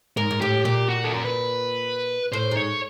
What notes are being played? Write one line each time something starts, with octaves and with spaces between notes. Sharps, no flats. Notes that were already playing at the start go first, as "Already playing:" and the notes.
G#2 A#4
G#2
A2 G4
A#2 G4
F#4
A4
A#4
B4
A2 C5
G#2
C#5